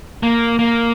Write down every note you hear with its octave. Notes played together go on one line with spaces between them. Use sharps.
A#3
A#3